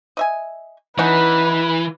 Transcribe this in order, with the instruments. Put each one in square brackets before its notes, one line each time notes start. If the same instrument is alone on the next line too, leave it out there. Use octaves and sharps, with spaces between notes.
[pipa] D#5 E5 G#5
[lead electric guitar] E3 [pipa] C#4 D#4 F#5 [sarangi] B4